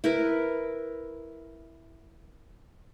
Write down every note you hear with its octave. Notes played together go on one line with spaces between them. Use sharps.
E4 A#4 B4